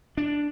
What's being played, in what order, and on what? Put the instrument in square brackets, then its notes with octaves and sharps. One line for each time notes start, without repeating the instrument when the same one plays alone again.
[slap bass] D4